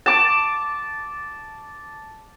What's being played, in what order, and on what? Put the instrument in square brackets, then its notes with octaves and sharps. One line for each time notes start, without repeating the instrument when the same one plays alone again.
[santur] A5 D6